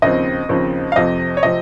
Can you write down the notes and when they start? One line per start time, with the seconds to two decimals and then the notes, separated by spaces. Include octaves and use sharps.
0.02 D#2 C#3 F3 C4 D#5
0.49 D#2 C#3 F3 C4
0.92 F5
0.96 F2 C3 F3 C4 D#5
1.37 C#5
1.43 C3 F3 C4 D#5